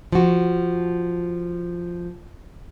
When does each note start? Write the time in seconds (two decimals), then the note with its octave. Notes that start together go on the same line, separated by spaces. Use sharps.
0.12 F3 F#4